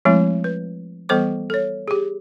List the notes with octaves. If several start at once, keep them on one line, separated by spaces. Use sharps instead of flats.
F3 G#3 A3 C4 E4
B4
E3 G3 B3 A4 C5 D6
A4 C#5
G4 G#4